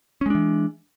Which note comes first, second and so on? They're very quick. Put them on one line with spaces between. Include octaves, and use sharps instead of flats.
C#4 G#3 D4 E3